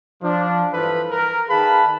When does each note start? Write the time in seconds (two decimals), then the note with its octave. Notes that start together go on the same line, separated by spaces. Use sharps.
0.23 F3 D4
0.73 G2 E3 F3 A4 B4
1.11 A#4
1.49 D#3 G#4 B4 F5 A5 B5